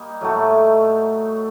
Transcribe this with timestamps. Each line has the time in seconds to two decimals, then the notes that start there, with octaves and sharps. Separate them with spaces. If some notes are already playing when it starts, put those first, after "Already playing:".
Already playing: G3 A#3 D#4
0.21 A2 F#3 A3